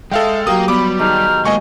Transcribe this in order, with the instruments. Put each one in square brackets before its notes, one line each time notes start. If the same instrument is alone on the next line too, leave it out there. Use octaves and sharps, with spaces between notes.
[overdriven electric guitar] G#3 [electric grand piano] A4 F5 G5 [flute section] E5
[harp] F#3 F4 G4 [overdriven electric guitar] A#3 [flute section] G5 A#5 [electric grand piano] D#6
[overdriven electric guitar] G3 [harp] B3 [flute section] B5 [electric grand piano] D6
[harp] D#3 G#4 A5 [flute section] A#5 F6 G6
[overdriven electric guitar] G#2 A#3 [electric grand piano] D#5 G#5 C#6